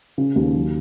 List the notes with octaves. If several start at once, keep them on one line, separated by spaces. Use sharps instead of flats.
C#3
D#2
F#3